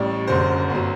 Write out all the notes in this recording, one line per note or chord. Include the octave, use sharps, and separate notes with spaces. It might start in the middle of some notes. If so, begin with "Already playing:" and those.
Already playing: A1 A2 G3 D5
F#1 F#2 D3 F#3 C5
G1 F#3